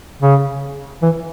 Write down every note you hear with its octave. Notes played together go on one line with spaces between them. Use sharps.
C#3
E3